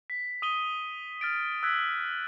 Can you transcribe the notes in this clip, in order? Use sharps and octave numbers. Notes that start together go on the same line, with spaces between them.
B6
D#6 D#7 G7
F6 A6 D7
E6 F#6 G#6 B6